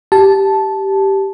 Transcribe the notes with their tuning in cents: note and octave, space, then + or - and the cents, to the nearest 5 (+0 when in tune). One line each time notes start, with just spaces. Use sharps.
G4 -5 A5 -10